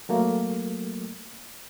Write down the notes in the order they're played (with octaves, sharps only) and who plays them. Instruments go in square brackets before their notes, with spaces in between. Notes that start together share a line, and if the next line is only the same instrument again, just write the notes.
[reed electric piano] F#3 A3 A#3